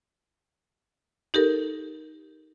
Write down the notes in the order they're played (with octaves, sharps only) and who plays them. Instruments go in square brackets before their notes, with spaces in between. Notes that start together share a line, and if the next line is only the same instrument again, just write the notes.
[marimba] D#4 G4 A4 A#4